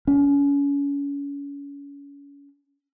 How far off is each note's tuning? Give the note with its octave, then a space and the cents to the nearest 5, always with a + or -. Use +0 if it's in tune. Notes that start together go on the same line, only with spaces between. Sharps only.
C#4 +30